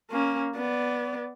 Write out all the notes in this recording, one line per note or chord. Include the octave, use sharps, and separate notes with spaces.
A#3 C#4
B3 D5